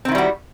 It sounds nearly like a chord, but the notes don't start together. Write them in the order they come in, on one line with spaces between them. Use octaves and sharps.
C4 D#3 E4 G3 F#4